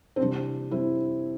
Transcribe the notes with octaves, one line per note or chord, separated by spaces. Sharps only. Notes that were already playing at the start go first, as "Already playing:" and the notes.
C4
C3 E3 G3 D4
G3 C4 E4